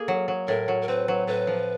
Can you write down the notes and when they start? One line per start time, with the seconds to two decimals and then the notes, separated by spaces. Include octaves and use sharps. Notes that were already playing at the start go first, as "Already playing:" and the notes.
Already playing: A#3 G#4 A4
0.08 F#3
0.28 F#3
0.48 A2 A#4
0.68 F#3
0.82 A#4
0.88 C4 B4
1.08 F#3
1.27 A2 B4
1.47 F3